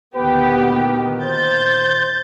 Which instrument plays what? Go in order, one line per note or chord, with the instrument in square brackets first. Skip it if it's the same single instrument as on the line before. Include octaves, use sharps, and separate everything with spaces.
[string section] D2 B3 G4 [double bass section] A#2 D#3 [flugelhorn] B4
[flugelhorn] C5 [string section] G6 A6